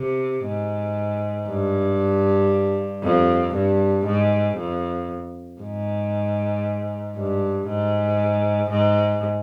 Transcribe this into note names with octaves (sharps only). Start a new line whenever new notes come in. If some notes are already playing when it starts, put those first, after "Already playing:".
Already playing: C3
G#2
G2
F2
G2
G#2
F2
G#2
G2
G#2
G#2